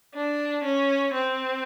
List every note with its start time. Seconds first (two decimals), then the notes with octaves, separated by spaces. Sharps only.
0.14 D4
0.64 C#4
1.13 C4